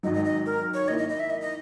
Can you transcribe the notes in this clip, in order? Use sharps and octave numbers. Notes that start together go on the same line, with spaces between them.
G#1 G#2 D#3 F#3 D#5
D#5
D#5
A#4
C#5
D#3 A#3 E4 D#5
D#5
D#5
E5
D#5
D#5